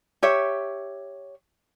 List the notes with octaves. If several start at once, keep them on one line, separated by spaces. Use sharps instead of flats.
G4 C#5 E5